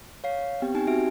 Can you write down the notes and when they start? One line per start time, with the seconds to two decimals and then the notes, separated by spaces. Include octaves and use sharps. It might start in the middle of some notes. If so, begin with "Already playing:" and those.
0.24 C#5 F5 C7
0.62 B3 C4 G4 G5
0.75 D#4 G4 G5 G#5
0.87 C4 F#4 E5 D7